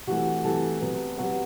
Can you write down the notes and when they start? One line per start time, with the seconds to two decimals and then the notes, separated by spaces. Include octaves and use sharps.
0.07 C3 E3 A3 F#4 F#5
0.44 C3 E3 A3 A4 A5
0.81 C3 F#3 B3
1.18 C3 F#3 B3 F#4 F#5